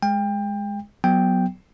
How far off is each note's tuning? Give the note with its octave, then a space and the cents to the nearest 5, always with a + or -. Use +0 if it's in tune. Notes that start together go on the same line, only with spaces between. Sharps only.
G#3 +0 G5 +25
F#3 +0 B3 +0 G5 +0